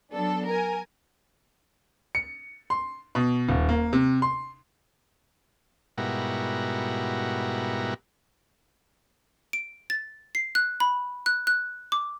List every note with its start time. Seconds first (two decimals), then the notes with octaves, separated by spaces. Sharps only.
0.13 F#3 B3 D4 A4
0.47 A#4 G#5
2.15 C#7
2.70 C6
3.15 B2
3.49 D#1
3.69 A#3
3.93 C3
4.22 C6
5.98 G#2 B2 G3 E4 F#4 A#4
9.53 D7
9.90 A6
10.35 C7
10.55 F#6
10.80 B5
11.26 F#6
11.47 F#6
11.92 D6